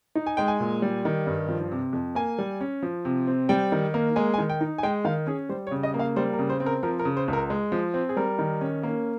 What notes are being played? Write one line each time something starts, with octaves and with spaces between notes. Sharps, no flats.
D#4
G#5
G#3 G5
G#5
A#2
G3
D#3
G2
F3
C3
F2
A#3 G#5
G3
C#4
F3
C3
C4
G3 G5
D#3
A#3
G#3 G#5
G#5
D#3
G5
D#4
G#5
G#3 G5
D#3 F5
C#4 G#4
G3 C5
C#5
C#3
D#5
A#3
F5
G3 C5
A#4
C#3
C5
C4
A#4
F3 A#4
A#4
C#3
C5
C#2
A#4
G#3
F3
C4
G#4
G3 A#4
D#3
C#4
A#3